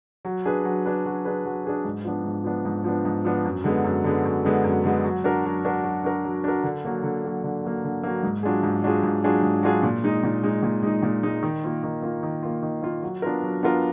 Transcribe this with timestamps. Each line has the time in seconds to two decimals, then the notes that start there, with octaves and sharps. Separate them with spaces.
0.25 F#3
0.46 D4 G#4 B4
0.65 F#3
0.85 D4 G#4 B4
1.06 F#3
1.25 D4 G#4 B4
1.45 F#3
1.64 D4 G#4 B4
1.85 G#2
2.04 F3 B3 D4
2.24 G#2
2.44 F3 B3 D4
2.65 G#2
2.84 F3 B3 D4
3.05 G#2
3.25 F3 B3 D4
3.45 F#2
3.64 D3 G#3 B3
3.84 F#2
4.04 D3 G#3 B3
4.25 F#2
4.45 D3 G#3 B3
4.64 F#2
4.84 D3 G#3 B3
5.04 F#3
5.24 D4 F#4 A#4
5.45 F#3
5.65 D4 F#4 A#4
5.84 F#3
6.04 D4 F#4 A#4
6.25 F#3
6.44 D4 F#4 A#4
6.63 D3
6.85 F#3 A#3
7.03 D3
7.24 F#3 A#3
7.43 D3
7.64 F#3 A#3
7.84 D3
8.03 F#3 A#3
8.23 G#2
8.43 F#3 D4 F4 G#4
8.63 G#2
8.83 F#3 D4 F4 G#4
9.03 G#2
9.24 F#3 D4 F4 G#4
9.43 G#2
9.63 F#3 D4 F4 G#4
9.83 A#2
10.04 G#3 D#4
10.24 A#2
10.43 G#3 D#4
10.63 A#2
10.83 G#3 D#4
11.03 A#2
11.23 G#3 D#4
11.43 D#3
11.64 A#3 F4
11.84 D#3
12.02 A#3 F4
12.23 D#3
12.43 A#3 F4
12.62 D#3
12.82 A#3 F4
13.03 F#3
13.22 B3 D4 F4 A#4
13.43 F#3
13.63 B3 D4 F4 A#4